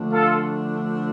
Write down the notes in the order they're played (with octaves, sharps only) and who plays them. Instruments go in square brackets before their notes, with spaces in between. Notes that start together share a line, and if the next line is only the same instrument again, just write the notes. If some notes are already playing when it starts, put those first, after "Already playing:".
Already playing: [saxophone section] D3 F3 A3 D4
[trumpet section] F4 A4